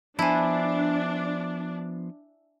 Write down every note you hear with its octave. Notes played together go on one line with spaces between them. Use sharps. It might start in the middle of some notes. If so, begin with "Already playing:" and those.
F3 B3 D4 E4 C5 G#5 A5